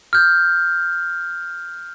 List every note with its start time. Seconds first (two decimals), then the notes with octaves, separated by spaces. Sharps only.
0.13 F6 G6